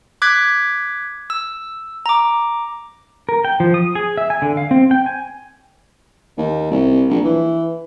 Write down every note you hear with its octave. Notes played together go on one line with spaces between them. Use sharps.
D6 F#6 G#6 B6
E6
A#5 D6
A#4
G5
F3
D#6
G#4
E5
G#5
D3
F5
C4
G5
G#5
D#2
C2
A#1
E3